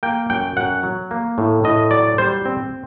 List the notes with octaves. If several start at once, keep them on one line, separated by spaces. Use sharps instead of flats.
A#3 G5
F#2 G5
F#2 F#5
F#3
A#3
A2
A2 D#5
F#3 D5
G3 C5
C4